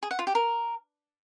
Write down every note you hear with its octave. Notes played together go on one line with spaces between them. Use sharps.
G#4
F#5
F4
G4
A#4